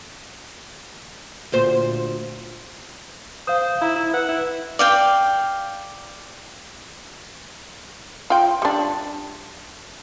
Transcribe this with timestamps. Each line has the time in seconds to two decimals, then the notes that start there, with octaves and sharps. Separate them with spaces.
1.52 D2 A#2 C5
3.47 C5 F5 D#6
3.81 E4 A#5 B5
3.96 E4
4.14 B4 F#5
4.29 E4
4.79 D5 F5 G5
8.30 F4 G5
8.62 G3 D4